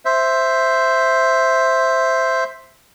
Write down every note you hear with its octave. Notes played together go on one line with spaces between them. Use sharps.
C5 E5